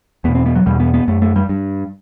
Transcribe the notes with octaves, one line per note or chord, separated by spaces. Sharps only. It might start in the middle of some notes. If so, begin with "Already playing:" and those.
E2 B2 B3
C4
B3
F#3
E2 B2 G3
B3
B3
F#2 A3
A3
G3
G2